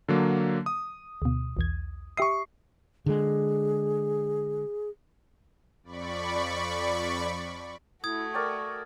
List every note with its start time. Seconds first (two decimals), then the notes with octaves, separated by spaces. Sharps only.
0.08 D3 F#3 A#3
0.66 D#6
1.22 D2 B2
1.57 B1 E2 G#6
2.17 G4 E5 C#6 D#6 C7
3.06 D3 G#3 G#4
5.83 F2 D5 B5 C#6
8.04 A3 E4 F#4 D#6 G#6
8.34 A#4 D5 G5 C#6